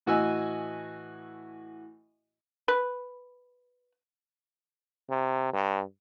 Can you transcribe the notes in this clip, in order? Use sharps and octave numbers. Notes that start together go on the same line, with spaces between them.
A2 E3 F#4 D#5 G#5 E6
B4
C3
G2